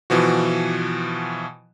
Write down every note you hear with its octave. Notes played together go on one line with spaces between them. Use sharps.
B2 E3 F3 F#4